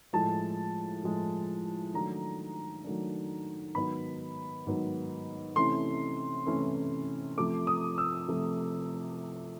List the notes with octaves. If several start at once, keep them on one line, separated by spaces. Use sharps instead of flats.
A2 F3 G#3 A5
A2 F3 G#3
D#3 F#3 A3 D4 A#5
D#3 F#3 A3 D4
G#2 D#3 F#3 B3 D#4 B5
G#2 D#3 F#3 B3 D#4
C3 E3 A3 C#4 E4 C6
C3 E3 A3 C#4 E4
C3 F3 A3 D6
D#6
E6
C3 F3 A3